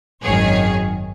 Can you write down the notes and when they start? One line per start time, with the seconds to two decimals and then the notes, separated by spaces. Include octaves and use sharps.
0.22 G#1 F#2 D#3 G#4 C#5